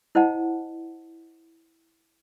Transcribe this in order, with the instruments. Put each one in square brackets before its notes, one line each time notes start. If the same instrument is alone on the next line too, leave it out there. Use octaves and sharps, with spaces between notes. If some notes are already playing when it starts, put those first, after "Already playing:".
[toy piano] E4 C5 D#5 F#5 A5